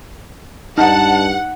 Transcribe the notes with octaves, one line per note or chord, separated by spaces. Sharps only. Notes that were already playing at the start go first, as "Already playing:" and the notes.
G2 D#4 F#5 A5